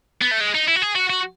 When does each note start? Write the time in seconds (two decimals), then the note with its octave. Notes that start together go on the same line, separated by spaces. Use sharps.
0.22 B3
0.32 A3
0.41 G#3
0.55 D#4
0.68 E4
0.76 F#4
0.82 G#4
0.96 F#4
1.10 F#4